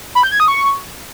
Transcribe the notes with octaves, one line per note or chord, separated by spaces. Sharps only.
B5
G6
G#6
D#6
C#6